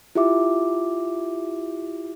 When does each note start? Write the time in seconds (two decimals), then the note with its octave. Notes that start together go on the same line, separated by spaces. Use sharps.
0.15 E4 F4 G4 E5 D6